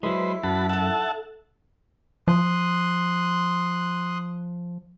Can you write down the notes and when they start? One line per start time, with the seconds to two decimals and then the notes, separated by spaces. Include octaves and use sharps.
0.03 F#3 G#3 E4 B4 C5
0.43 F#2 F#4 A5 B5
0.69 D#4 A4 E5 F#5 A5
2.28 F3 C6 D#6 F#6